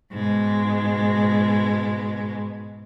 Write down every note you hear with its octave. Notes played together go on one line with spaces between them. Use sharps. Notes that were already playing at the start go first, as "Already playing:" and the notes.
G#2 B2 G#3